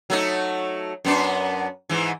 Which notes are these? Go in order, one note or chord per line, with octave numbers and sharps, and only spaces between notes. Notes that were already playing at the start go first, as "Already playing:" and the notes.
F#3 A3 D#4
F#2 B3 D4
G#2 E3